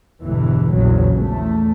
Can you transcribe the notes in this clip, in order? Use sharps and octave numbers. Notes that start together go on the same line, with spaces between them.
G1 E2 B2 E3
A#1 E2 C#3 F#3
E2 A3